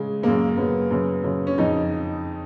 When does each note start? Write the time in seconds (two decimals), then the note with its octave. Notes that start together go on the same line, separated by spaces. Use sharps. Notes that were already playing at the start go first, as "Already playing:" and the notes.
Already playing: C#3 G#3
0.23 F#2 C#3 A#3
0.57 F#2 C#3 B3
0.91 F#2 C#3
1.24 F#2 C#3
1.47 C#4
1.58 F2 C#3 D#4